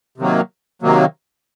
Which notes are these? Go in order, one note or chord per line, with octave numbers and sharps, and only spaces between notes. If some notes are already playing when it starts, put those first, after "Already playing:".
C3 D#3 F#3 A#3
C3 D#3 F#3 A#3